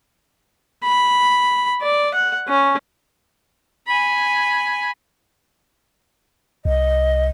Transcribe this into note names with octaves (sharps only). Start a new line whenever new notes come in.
B5
D5
F#5
C#4
G#5 B5
C2 D#5